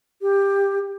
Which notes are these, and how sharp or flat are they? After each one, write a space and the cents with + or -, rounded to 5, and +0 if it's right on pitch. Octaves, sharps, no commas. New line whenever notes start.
G4 +15